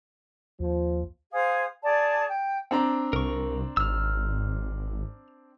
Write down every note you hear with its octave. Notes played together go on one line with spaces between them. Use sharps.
D#2 F3
G#4 C5 F5 D#6
G#4 D5 A5
G5
C4 D4 A#5
C2 A#4 C#6
G#1 E6 F6